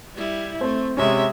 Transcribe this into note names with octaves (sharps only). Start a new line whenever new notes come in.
G3 E4
A3 C4
C3 G#3 C#4 E5